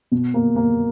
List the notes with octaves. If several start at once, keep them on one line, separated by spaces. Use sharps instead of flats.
B2
A#3
A#3